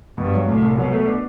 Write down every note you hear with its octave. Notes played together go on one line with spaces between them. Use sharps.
G2 B2
F#3
C2 A2
C2
B2 F#3
A3
D4